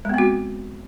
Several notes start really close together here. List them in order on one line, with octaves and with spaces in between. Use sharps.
G#3 B3 C4 F#4